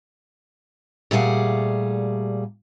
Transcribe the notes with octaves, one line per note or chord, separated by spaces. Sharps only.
A#2 G3 A3 G#4 F5 F#5